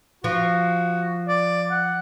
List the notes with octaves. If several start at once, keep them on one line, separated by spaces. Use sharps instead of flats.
F3 F#4
D5
F#5